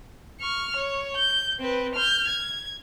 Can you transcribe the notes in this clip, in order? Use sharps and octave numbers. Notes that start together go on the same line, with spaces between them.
C#6 F6
C#5
G6
C4 B4
F6 G6
G#6